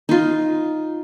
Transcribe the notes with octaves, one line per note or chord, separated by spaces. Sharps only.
D#4 F4